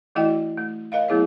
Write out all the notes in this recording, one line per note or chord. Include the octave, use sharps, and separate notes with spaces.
E3 A3 E4 F#4 D#5 G5
A3
A#4 D#5 F5
F#3 A3 B3 E4 G#4 C#5